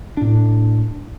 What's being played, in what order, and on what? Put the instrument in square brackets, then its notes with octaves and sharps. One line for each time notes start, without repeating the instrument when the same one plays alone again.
[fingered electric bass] A2 D4